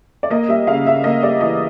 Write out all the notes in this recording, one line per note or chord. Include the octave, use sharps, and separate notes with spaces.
D5
A#3 D#5
G3 E5
C#3 F5
C#3 E5
A#3 D#5
G3 D5
E3 D#5